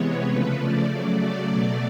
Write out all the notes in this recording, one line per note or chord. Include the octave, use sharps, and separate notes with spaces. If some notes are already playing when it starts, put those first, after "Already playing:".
Already playing: C3 E3 G#3 B3 C#5
C#3 F3 A3 B4
D5
C#3 F#3 A3
D5
B2 F#3 A3